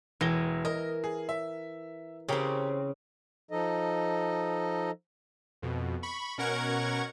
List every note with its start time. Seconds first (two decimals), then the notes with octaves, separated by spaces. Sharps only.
0.21 E1 E3 A#6 G7
0.65 A#4 D#5
1.04 G#4
1.29 E5
2.29 C#3 C4 C#4 G4 A#4
3.51 F3 D#4 A4 D#5
5.62 F2 B2
6.03 B5 C#6
6.38 B2 C#4 A#4 F#5 C#6 G#6